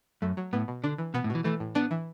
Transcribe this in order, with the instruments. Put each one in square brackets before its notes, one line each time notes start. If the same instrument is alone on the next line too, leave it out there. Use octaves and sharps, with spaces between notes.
[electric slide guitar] F#2 [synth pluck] A3
[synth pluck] F#3
[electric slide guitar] A2 [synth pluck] B3
[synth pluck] B2
[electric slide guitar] D3 [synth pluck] D4
[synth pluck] E3
[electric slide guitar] B2 [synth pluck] B3
[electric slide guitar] A2
[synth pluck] B2 [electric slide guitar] E3
[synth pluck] E3 [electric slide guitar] A3
[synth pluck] A2
[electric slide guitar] B3 [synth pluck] D4
[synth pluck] E3